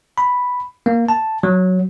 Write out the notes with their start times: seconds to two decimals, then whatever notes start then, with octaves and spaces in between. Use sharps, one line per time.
0.18 B5
0.86 A#3
1.09 A5
1.43 F#3